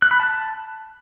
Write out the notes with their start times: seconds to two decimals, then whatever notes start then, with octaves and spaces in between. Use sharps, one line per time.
0.02 F#6
0.11 B5
0.20 A5